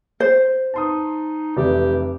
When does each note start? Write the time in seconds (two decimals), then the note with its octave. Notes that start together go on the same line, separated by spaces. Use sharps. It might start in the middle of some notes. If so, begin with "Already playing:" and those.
0.20 C5
0.74 D#4 A5 C6 D#6
1.57 F1 E3 G4 D5